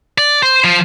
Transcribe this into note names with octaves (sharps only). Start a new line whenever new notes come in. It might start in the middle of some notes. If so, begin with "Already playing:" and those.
D5
C5
F3